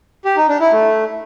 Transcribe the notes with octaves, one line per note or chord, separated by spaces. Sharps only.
G4
D#4
D4
E4
A3